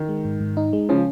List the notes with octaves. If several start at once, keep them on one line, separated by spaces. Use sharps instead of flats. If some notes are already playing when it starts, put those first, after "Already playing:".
Already playing: D#3
G#3
G#2
G#2
D#4
G#3
C#3 F3 C#4